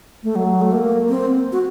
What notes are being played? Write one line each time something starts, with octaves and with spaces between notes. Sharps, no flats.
A3
F#3
A3
A#3
C4
F#4